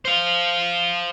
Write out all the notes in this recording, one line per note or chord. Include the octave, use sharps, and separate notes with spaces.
C5 F5